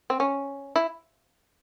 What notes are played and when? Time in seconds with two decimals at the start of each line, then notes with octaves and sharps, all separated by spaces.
0.10 C4
0.20 C#4
0.76 E4